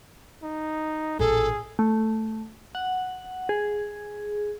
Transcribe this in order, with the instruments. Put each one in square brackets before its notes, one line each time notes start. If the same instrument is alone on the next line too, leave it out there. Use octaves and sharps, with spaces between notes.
[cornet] D#4
[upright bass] A1 A#2 [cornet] G#4 [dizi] A4
[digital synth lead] A3
F#5
G#4